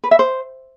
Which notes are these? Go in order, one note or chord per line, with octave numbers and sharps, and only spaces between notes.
B4
E5
C5